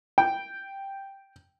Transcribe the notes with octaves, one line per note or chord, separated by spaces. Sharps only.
G5